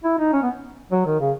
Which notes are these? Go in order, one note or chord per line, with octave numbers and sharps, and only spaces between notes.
E4
D#4
C#4
B3
F#3
D#3
C#3